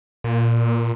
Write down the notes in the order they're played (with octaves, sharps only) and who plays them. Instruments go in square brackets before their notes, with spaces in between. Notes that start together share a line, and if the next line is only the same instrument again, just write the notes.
[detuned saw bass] A#2